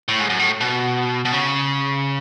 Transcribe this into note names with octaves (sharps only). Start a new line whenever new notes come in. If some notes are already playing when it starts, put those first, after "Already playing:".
A2
G#2
F#2
A2
B2
B2
C#3